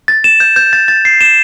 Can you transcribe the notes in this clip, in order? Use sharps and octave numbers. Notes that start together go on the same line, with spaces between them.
A6
E7
G6
G6
A6
A6
C7
E7